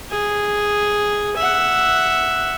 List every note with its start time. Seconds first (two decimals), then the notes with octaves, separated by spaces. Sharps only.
0.10 G#4
1.36 E5 F#5